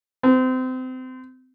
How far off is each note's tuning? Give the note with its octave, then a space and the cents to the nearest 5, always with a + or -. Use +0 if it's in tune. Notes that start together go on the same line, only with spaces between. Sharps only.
C4 -30